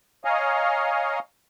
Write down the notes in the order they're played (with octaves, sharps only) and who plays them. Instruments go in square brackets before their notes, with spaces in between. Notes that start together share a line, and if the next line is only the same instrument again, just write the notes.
[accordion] C#5 D#5 F5 G#5 A#5